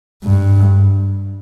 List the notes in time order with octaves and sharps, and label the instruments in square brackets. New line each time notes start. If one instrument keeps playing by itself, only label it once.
[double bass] G2